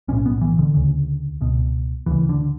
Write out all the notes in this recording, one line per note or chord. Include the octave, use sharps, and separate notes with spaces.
B1 A2 C#4
B3
E3
D3
D2 C#3
C#2 B2
D2 C#3 E3
D3